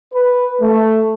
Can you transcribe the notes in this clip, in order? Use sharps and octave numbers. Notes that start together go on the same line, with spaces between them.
B4
A3